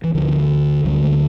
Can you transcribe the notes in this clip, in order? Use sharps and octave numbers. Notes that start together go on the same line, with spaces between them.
E3
D2 D3 F3
D2 D3 F#3
G3
A3
A#3